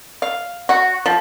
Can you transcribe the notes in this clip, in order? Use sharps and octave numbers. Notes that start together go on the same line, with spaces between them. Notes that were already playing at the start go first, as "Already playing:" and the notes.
F5
F#4
F3